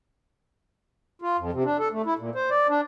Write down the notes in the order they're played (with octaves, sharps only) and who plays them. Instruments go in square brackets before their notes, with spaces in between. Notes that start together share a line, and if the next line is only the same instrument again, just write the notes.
[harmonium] F4
F2
C3
D4
A4
A3
E4
A#2
C5
D5
D4